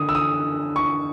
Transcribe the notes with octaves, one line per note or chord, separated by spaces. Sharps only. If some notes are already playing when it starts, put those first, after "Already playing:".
Already playing: D3 D#6
E6
D#6
C#6